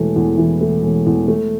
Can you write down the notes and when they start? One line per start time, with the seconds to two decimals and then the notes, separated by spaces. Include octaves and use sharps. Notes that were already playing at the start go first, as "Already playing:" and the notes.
Already playing: E1 E3 A3
0.16 E2
0.38 E3
0.61 A3
0.83 E1
1.06 E2
1.28 A3